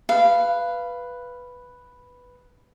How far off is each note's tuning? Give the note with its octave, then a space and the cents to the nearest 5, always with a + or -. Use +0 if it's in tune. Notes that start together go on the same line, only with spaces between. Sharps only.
B4 +0 F5 -15